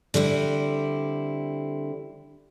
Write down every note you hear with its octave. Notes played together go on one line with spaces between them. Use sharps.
D3 G3 C4 E4